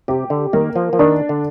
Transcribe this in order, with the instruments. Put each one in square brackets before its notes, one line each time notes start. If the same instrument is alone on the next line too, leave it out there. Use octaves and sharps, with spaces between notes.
[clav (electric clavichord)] C3 [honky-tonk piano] G4
[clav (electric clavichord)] D3
[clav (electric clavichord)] D#3 [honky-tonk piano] A#3
[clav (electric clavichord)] F3
F3
[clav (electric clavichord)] D#3 [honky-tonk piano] D4
[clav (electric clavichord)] D3